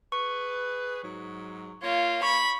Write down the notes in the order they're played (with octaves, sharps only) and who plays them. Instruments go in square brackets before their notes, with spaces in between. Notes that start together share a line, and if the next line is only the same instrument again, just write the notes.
[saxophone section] G#4 B4 [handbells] C#6
[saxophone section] G#2 F#3
[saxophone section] A#3 C#5 [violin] F4
[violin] B5 [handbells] C#6